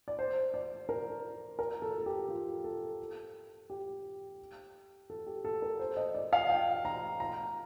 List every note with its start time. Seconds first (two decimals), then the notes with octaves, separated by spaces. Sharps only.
0.08 D5
0.19 C5
0.54 D5
0.89 A#4
1.59 A#4
1.82 A4
1.98 A4
2.06 G4
2.29 F4
2.64 A4
3.70 G4
5.10 A4
5.27 G4
5.45 A4
5.62 A#4
5.79 C5
5.97 D#5
6.15 D5
6.33 F5
6.50 G5
6.85 A#5
7.20 A#5